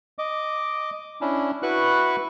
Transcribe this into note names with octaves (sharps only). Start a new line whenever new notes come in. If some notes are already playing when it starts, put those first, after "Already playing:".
D#5 D6
C#4 D4 E4
E4 F#4 B4 C#6 F#6